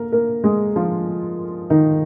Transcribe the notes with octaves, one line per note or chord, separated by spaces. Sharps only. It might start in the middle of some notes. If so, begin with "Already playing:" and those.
Already playing: A#3 A#4
A#3 A#4
G#3 G#4
F3 F4
D#3 D#4